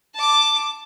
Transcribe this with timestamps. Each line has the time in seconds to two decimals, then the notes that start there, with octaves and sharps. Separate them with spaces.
0.15 A5 D6